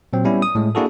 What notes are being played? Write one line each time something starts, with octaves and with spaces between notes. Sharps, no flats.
A#2 F#3 C4
G3 B3 C#4 E4
D#6
A2 G#3
A#3 D4 E4 F#4 G#4 A4